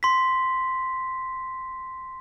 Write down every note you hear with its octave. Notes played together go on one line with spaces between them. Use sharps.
C6 B6